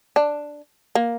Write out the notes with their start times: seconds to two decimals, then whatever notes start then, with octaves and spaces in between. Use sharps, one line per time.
0.16 D4
0.95 A#3